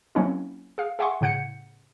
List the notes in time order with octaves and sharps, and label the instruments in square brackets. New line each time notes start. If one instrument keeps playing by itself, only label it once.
[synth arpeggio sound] F#3 A#3 C4 C#4 D#4 E4
G#4 F5
G#4 E5 F#5 G#5 C6 C#6
A2 C#3 F#5 G6 C#7